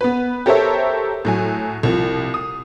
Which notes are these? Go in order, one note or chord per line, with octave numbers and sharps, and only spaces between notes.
B3 B4
G4 A4 A#4 C5 C#5 E5
A2 F#3 G#5
C2 F3
D#6